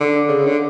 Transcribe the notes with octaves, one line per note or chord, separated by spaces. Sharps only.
D3
C#3
D3